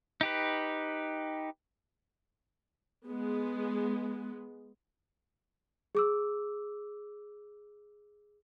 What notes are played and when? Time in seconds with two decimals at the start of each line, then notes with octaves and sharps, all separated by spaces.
0.21 D#4 G4 B4
3.06 G#3 B3
5.95 G#4 D6 E6